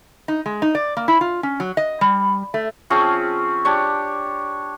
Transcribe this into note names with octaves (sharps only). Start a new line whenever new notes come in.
D#4
G#3
D#4
D5
A#3
E4
F4
C#4
F#3
D#5
G3
A3
F3 C4 C#4 G#4
D4 G4 C#5